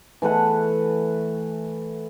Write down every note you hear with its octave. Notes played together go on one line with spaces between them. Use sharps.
E3 A3 B4 F#5